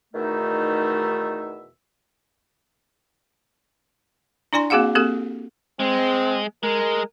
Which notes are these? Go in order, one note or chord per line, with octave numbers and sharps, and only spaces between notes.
E2 B2 D#3 A3 D#4 E5
D4 E4 D5 G#5 C6
A#3 C4 F#4 G#4 F5 F#5
A#3 C4 G4 A4
G#3 C4
G#3 A#4